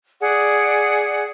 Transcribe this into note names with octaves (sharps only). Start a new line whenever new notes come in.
G#4 D5 F#5